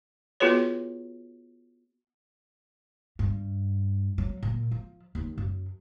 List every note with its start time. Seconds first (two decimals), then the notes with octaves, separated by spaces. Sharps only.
0.40 B3 F4 F#4 G#4 B4 C#5
3.19 G2
4.18 F#3
4.43 A#2
4.71 F3
5.15 D#2
5.38 F#2